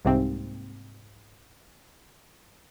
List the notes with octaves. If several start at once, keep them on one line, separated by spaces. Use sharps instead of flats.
C2 G#2 C3 A#3 C4